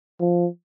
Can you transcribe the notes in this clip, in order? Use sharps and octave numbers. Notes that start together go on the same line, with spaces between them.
F3